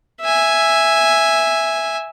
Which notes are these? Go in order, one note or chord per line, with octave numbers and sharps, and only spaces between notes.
E5 G#5